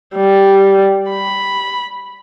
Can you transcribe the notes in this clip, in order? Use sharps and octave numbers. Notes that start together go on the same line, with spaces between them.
G3
B5